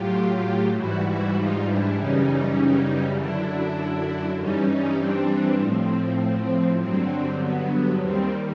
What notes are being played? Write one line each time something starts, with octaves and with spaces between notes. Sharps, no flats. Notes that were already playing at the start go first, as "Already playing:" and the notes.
Already playing: A2 F#3 F4 G4
G#2 E3 G3 E4 F#4
E4 F#4
D#4 F4
D4 E4
F#2 C#3 E3 G3 C#4 D#4
F#2 D3 F#3 D4 E4
G2 E3 G3 C#4 D#4
C#4 D#4
C4 D4
A2 F3 C4
G2 D3 F#3 C4
B3
D#2 D#3 G3 C4